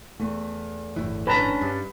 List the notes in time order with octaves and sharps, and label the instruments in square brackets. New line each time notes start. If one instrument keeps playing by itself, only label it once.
[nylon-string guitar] E2 A3
[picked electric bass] G1 A2 E3
[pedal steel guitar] C#4 D4 [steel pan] B4 A5 A#5
[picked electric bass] G2